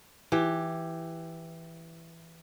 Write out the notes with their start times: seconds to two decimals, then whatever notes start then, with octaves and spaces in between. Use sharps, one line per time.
0.32 E3 G4